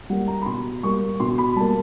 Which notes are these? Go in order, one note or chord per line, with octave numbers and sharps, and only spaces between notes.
G3 A#3 F#5
A#5
B5
B2 C6
G3 A#3 C#6
B2 C6
B5
G3 A#3 A5